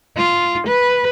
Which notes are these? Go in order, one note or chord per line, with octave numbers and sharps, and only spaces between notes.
F4
B4